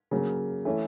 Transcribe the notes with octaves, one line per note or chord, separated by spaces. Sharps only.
C#3 F#3 A#3
E3 A3 C#4